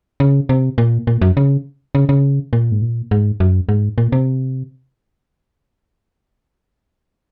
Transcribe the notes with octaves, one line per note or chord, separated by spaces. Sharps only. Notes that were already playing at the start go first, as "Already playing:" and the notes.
C#3
C3
A#2
A#2
F#2
C#3
C#3
C#3
A#2
G#2
A#2
G#2
F#2
G#2
A#2
C3